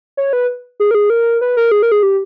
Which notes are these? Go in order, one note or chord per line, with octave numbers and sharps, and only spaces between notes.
C#5
B4
G#4
A#4
G#4
A#4
B4
A#4
G#4
A#4
G#4
G4